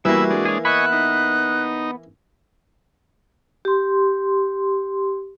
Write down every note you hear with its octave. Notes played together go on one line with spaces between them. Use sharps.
E3 G3 A#3 B3 E4 F#4 E5
G#3 D4
G#4 C#5
B3 D#5 E5 G#5 B5 C#6 F#6
D#4
G4 C6